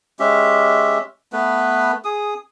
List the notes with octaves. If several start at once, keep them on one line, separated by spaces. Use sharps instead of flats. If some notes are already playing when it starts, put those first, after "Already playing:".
G#3 C#4 G4 E5
A3 B3 B4
G#4 D#6